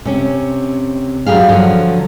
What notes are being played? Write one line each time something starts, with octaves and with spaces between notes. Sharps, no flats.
C3 C#4
G2 F#3 G4 G#4 F5
D3 F3 F#3